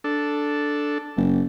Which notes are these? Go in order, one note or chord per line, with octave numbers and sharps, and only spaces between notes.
D4 A4
F#1